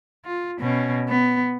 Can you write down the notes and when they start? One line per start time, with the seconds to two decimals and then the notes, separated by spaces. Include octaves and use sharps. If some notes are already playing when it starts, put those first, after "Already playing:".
0.25 F4
0.60 B2 C#4
1.08 B3